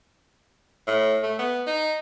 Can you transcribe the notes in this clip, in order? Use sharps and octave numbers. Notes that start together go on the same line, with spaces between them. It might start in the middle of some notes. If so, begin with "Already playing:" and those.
A2
A3
B3
D#4